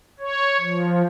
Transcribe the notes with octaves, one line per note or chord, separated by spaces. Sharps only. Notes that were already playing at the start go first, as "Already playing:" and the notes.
C#5
F3